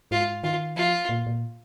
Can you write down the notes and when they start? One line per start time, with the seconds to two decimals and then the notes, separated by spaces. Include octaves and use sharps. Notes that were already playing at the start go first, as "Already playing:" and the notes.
0.11 G#2 F4
0.43 D#3 F4
0.76 F3 F4
1.09 A#2
1.26 A#2